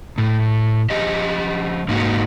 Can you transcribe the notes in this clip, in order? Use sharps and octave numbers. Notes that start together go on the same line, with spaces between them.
A2
F3 G4 D#5
G#2 A#3 D#4 F#4